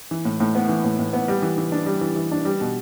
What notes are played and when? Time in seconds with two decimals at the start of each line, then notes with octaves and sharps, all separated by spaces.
0.11 E3
0.25 A2
0.40 A2
0.55 B3
0.69 E3
0.84 A2
0.99 A2
1.13 B3
1.28 G3
1.42 E3
1.58 E3
1.72 D4
1.86 G3
2.01 E3
2.16 E3
2.31 D4
2.45 G3
2.61 B2